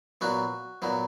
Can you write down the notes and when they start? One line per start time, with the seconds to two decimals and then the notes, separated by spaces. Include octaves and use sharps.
0.21 A#2 F#3 B3 F#4
0.82 A#2 F#3 B3